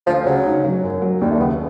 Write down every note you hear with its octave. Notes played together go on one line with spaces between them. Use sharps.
D2 F3
C#3 F#3
D#4
F#3
F#2
F#3
D#2 G3
A3
C#3 B3